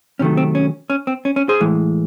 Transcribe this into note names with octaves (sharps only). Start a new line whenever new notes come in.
C3 D#3 F#3 A3 C#4
C4
C#4
C#4
C4
C#4
C#4
G#4 C5
A2 E3 G#3